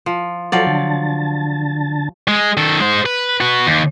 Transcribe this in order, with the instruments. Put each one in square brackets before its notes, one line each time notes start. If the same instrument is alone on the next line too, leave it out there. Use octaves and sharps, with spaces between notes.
[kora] F3
[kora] F3 F#3 D5 [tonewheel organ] A4
[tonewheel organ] D3 A5
[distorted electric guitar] G#3
D#3 A4
G#3 C5
B4
F#4 B4
D#2